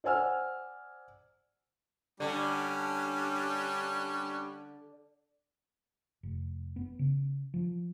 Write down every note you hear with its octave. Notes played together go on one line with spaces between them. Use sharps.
C5 D5 F#5 G#5 E6 F6
D3 G3 C#4 D4
F1
B3
C#3
F3